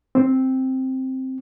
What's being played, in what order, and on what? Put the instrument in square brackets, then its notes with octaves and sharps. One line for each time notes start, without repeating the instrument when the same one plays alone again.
[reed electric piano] C4